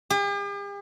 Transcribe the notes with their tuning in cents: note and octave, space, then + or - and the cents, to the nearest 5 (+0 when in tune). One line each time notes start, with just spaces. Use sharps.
G4 +45